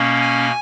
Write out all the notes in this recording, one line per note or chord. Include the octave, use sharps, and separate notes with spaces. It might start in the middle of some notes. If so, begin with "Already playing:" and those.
Already playing: B2 A#3 C#4
G#5